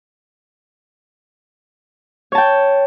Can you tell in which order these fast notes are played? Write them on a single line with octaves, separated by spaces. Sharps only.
C#5 A5 G5